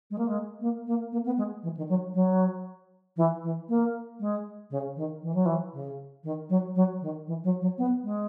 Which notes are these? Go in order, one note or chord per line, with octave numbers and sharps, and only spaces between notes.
G#3
A#3
G#3
A#3
A#3
A#3
B3
G#3
E3
D#3
F#3
F#3
E3
E3
A#3
G#3
C#3
D#3
E3
F#3
E3
C#3
D#3
F#3
F#3
D#3
E3
F#3
F#3
B3
G#3